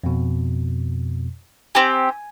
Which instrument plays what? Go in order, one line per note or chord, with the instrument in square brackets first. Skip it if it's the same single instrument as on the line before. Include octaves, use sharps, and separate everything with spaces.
[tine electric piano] F2 B2
[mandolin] C4 G4 [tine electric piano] G#5